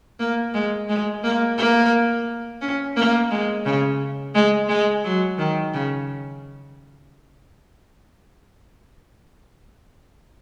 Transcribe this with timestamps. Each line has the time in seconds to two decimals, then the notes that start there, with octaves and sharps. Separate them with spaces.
0.19 A#3
0.54 G#3
0.89 G#3
1.24 A#3
1.57 A#3
2.61 C#4
2.96 A#3
3.31 G#3
3.65 C#3
4.35 G#3
4.68 G#3
5.04 F#3
5.38 D#3
5.73 C#3